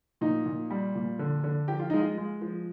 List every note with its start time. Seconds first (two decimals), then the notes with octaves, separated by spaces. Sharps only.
0.21 A#2 D#4
0.46 A#2
0.71 G3
0.95 A#2
1.19 D3
1.44 D3
1.68 F3 G4
1.80 F4
1.90 G#3 D#4
2.00 F4
2.18 G#3
2.41 F3